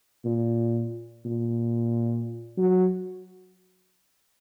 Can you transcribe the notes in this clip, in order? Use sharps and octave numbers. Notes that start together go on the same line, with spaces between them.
A#2
A#2
F#3